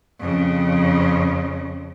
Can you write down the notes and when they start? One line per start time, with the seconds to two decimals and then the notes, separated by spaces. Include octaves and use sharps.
0.20 F2 C#3